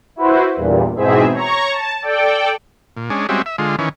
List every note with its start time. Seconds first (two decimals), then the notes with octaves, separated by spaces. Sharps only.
0.16 E4 F#4 B4 C5
0.56 E2 G2 A#2
0.96 G#2 B2 E3 C4 G#4 E5
1.33 C#5 A#5 C#6
1.71 A5
2.01 A4 D5 G5
2.97 A#2
3.10 G#3 C#4 D4
3.29 G3 G#3 C4 C#4 F#4 E5
3.46 E5
3.58 D3 G#3 F4
3.79 D#3 E3 C#4